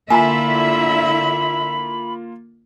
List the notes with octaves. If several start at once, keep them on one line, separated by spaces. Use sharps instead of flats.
D3 A#3 E4 F4 E5 G#5 A#5 B5